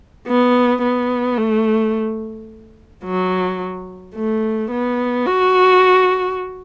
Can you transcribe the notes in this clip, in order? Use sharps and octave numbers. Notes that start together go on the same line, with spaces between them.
B3
B3
A3
F#3
A3
B3
F#4